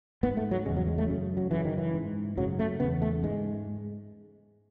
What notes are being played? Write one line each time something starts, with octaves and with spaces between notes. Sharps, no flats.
G#2 B3
A3
F#3
E2 C#3 G#3
F#3
G#3
A3
F#2 C#3
F#3
F#2 C#3 E3
D#3
E3
G#2
F#2 C#3 F#3
A3
E2 C#3 B3
A3
G#2 G#3